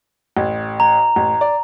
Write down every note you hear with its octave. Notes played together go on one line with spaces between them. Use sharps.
A1
A#5
A1
D5